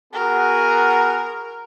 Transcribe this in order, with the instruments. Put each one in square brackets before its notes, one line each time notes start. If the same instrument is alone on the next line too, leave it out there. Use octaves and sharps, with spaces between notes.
[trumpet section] B3 F#4 G#4 [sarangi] A#4